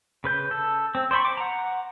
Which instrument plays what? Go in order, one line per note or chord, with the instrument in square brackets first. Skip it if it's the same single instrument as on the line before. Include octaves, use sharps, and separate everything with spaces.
[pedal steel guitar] C#3 B4 G6
A4
C4
C5 D5 G5 B5 C#6
D6
F#5 A#5